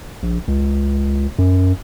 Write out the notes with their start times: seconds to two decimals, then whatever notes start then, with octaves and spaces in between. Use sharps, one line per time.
0.23 A#1
0.48 C#2
1.38 F#2